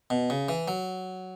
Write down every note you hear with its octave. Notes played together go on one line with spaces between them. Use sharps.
B2
C#3
E3
F#3